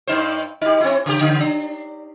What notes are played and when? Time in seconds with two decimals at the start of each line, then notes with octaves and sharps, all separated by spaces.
0.07 G2 D#4 C5
0.61 D#4 G4
0.80 C4 E4
1.06 C#3 G4
1.21 C#3
1.40 D4